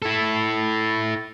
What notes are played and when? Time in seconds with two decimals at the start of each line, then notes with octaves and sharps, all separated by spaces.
0.02 E4 A4